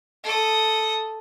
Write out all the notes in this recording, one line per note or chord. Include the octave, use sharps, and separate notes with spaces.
A4 D#6